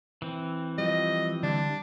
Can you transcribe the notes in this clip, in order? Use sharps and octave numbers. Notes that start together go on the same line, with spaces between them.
E3 C4
F3 G3 D#5
D3 G3 D4